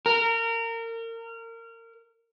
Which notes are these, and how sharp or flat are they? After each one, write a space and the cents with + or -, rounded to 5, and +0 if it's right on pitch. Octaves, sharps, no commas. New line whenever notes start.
A#4 -25